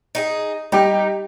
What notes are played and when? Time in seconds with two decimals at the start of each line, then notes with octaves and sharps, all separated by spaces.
0.15 D#4 G4 G#4
0.72 G3 D#4 G4